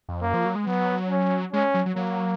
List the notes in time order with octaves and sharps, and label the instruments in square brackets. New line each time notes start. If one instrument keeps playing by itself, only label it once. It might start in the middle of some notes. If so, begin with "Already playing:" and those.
[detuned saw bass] F2
[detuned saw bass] F#2 [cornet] A#3
[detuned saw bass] F3
F#3
G#3
[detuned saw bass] F#3 [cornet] B3
[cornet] C#4
[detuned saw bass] G#3 [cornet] C#4
[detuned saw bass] F#3
F#3
[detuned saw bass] F#3 [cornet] A#3